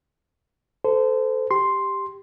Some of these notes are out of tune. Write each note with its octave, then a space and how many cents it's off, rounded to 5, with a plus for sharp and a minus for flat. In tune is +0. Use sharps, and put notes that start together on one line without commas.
A4 +0 C5 -25
G4 +0 C6 +0